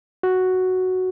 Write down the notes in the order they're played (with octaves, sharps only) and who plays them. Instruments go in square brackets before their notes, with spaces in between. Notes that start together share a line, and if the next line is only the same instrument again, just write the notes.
[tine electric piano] F#4